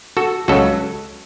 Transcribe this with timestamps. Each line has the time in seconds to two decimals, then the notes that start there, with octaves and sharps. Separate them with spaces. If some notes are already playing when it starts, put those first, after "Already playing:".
0.17 F#4 A4
0.48 C#2 C#3 F#3 F#4 A4